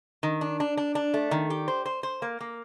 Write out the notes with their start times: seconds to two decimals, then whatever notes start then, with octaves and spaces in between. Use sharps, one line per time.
0.23 D#3
0.41 D4
0.60 D4
0.77 D4
0.95 D4
1.14 A3
1.31 D#3
1.50 G4
1.68 C5
1.85 C5
2.03 C5
2.22 A#3
2.40 A#3